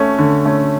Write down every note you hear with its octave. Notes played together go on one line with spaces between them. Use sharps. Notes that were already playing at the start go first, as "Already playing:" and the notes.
Already playing: A3 C#4
D3
A3 C#4